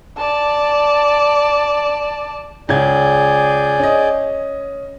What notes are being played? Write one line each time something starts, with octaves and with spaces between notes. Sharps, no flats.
D5 A5
C#2 C#4 G#4 D5 G6 G#6
C#4 D#5